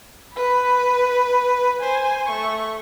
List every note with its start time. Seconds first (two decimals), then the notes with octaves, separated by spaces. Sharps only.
0.34 B4 B5
1.79 C5 G#5
2.28 A3 C#6